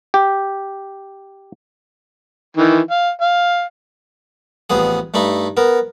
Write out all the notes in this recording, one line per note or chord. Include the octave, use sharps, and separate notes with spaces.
G4
D#3 E3
F5
F5
A1 F2 B3 G#4
G2 A3 D#4 B5
B3 A#4